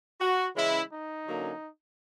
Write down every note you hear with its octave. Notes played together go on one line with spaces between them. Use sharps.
F#4
C#3 E3 G#3 C#4 E4
D#4
D3 F#3 A#3 C#4